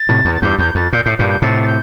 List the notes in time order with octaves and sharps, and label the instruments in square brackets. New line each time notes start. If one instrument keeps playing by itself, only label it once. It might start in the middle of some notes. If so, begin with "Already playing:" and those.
Already playing: [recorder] A6
[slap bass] A2 C3
E2
[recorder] A6
[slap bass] E2 G2 [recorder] G6
[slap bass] E2 [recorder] G6
[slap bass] F2 [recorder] A6
[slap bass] A#2 [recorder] G6
[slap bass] A2 [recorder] G6
[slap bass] G2 A#2 [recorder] G6
[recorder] G6
[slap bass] A2 C3 [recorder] A6
[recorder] A6
G6